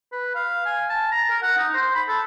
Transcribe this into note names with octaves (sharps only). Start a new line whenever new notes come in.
B4
F5
G#5
A5
A#5
A#4
F#5
D#4
C5
B5
A4